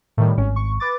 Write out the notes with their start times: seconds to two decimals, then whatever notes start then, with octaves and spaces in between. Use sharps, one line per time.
0.17 A2 D#3 G3
0.38 G#1 C#4
0.56 C#6
0.80 B4 D6 A6